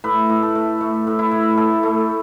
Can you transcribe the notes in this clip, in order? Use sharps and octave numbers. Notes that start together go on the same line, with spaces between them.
A2 B4
A2
A4
A3
A3
A2
E4
A2
A3 A4
A3